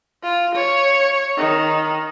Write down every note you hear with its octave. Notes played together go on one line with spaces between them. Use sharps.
F4
C#5
D#3